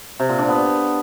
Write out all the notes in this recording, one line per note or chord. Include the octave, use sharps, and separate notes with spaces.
C3
A#2
D4
B3